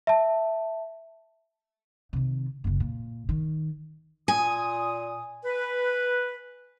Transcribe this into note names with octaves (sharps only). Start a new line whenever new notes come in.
E5 A5
C3 D#3
F#1 C#3
A#2
D#3
A#2 G#5 D#6
B4